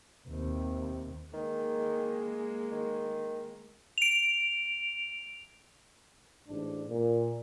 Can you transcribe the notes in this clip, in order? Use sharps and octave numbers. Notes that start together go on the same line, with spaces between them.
D#2 C3
D#3 G#3 A#3
D#3
D7 F7
A1 G#2 D4
A#2